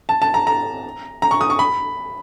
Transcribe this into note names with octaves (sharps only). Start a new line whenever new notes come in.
A5
A5
A#5
A#5
A#5
C#6
D#6
C#6
B5